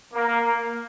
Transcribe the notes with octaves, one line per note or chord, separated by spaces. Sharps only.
A#3